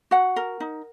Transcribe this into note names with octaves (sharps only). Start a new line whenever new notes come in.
F#4 F#5
A#4
D#4